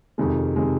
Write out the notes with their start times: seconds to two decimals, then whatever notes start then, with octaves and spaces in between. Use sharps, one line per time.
0.18 F2 C3 D#3 G#3
0.56 C3 D#3 G#3